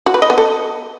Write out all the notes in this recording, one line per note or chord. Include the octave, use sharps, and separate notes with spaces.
F#4
B4
D#5
B3
A4